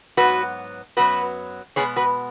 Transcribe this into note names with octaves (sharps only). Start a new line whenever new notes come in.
G#2 F#3 B3 F#4 B4
F#2 F#3 B3 F#4 B4
B2 G#3 B3 G#4 C#5
F#4 B4